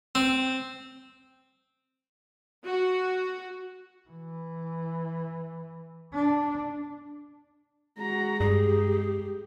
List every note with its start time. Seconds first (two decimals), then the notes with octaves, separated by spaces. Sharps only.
0.15 C4
2.66 F#4
4.10 E3
6.13 D4
7.98 G#3 F#4 A#5
8.40 G2 G4 G#4